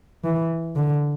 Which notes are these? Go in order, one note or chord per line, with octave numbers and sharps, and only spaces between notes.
E3
D3